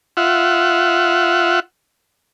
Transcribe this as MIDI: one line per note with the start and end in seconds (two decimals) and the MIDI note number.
0.17 1.60 65
0.17 1.60 76
0.17 1.60 78